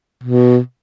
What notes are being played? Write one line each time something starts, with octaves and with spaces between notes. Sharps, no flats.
B2